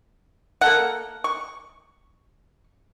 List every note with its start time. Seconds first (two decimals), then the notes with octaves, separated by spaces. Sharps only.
0.61 A#3 A4 F#5
1.24 C#6